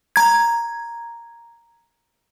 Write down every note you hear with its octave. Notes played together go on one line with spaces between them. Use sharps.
A#5 G#6